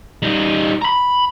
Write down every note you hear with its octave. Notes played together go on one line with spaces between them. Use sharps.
G3 D#4
A#5 B5